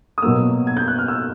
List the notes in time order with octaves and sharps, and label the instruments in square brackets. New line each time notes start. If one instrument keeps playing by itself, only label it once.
[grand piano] D#6
B2 F#3 A#3 E6
G#6
G6
F#6
F6
E6